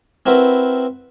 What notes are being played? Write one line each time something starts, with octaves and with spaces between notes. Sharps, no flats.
C4 E4 F#4 A#4 B4